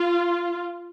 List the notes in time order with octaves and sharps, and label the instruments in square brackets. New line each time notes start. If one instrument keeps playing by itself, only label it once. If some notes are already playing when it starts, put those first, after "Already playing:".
Already playing: [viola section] F4